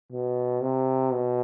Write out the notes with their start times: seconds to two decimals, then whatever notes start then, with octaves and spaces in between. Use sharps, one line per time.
0.12 B2
0.62 C3
1.13 B2